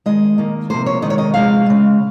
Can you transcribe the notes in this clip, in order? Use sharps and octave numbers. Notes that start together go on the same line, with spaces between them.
D#3 G#3 D#5
D#3 A#3
C3 F3 A#3 C5
C#5
C3 D#3 G#3 D#5
C#5
D#5
C3 F3 G#3 F5
C#3 G#3